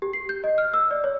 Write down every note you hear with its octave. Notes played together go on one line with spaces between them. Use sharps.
G4
C7
G6
D#5
F6
E6
D5
C#5